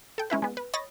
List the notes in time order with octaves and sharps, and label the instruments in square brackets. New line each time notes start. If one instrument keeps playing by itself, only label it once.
[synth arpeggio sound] A4 G5
G#3 C#4 E4 B4
G#3 B3
B4
C#5 D#5 B5 A6 A#6